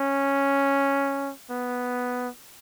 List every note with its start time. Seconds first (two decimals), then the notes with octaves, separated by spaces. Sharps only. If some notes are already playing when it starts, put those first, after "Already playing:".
Already playing: C#4
1.51 B3